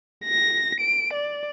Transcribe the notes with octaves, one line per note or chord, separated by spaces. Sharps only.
A#6
D7
D5